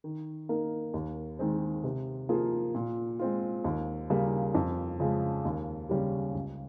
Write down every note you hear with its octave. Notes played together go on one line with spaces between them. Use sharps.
D#3
A#3 D#4 A#4
D#2
D#3 G#3 C4
C3
F3 A#3 F4 G#4
A#2
G#3 C4 F4
D#2
C#3 G3 A#3
F2
C#3 F3 G#3
D#2
C#3 G3 C#4 G4
C#2